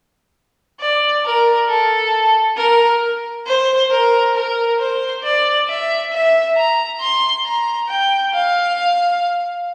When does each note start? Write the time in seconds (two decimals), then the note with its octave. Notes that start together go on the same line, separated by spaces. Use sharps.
0.81 D5
1.25 A#4
1.69 A4
2.57 A#4
3.47 C5
3.91 A#4
4.35 A#4
4.79 C5
5.23 D5
5.68 E5
6.13 E5
6.56 A#5
7.01 C6
7.45 A#5
7.89 G5
8.34 F5